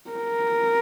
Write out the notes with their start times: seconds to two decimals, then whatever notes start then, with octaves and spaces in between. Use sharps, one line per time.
0.10 A#4